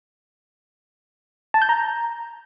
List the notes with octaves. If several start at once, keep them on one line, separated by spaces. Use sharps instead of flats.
A5
G6
A#5